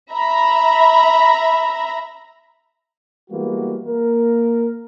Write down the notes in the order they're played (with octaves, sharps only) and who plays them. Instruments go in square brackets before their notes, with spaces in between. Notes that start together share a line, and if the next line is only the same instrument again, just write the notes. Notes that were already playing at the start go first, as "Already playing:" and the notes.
[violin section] E5 A#5 B5
[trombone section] E3 G3 G#3 A#3 B3 F#4
A#3 A#4